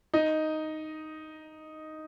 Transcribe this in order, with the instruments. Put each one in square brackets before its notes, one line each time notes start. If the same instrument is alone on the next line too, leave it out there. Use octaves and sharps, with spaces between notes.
[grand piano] D#4 D#5